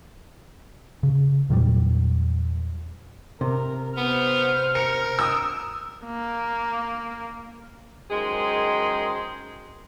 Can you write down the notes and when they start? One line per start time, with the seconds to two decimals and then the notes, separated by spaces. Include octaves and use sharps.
1.03 C#3
1.50 E2 A#2 F#3 G3
3.41 C3 A#4
3.97 B3 C5 F6
4.75 A#4 C#7
5.19 D#6 E6
6.05 A#3
8.10 F#2 D#3 G#3 G#4 C5